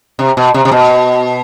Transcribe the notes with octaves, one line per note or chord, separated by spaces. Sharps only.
C3
B2
C3
C3
B2